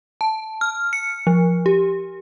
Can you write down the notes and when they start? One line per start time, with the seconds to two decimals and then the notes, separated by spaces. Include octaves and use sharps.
0.21 A5
0.61 F6
0.93 C#7
1.27 F3
1.66 G4